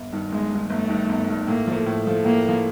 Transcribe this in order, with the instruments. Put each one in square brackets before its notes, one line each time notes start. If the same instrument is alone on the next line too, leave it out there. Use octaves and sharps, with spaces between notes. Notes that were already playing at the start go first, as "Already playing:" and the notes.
Already playing: [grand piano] G1
G2 D#3
[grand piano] G1 [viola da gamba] G#3
[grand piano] G2 D#3
[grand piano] G1 [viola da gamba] A3
[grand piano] G2 D#3
G1
G2 D#3
[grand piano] A2 [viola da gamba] A#3
[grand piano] F3 A3
A2
F3 A3
[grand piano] A2 [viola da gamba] A#3
[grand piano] F3 A3